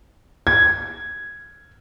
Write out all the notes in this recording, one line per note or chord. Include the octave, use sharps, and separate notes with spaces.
G#6